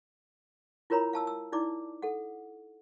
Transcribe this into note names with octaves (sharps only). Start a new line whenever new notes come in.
E4 F4 A#4 C#5 A#5 B5
F5 A5 E6
E6
D#4 E4 D5 D6
A4 F#5